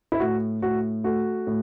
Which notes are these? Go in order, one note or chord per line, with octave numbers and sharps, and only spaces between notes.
E4
A2 F#4
A2 F#4
A3 F#4
A2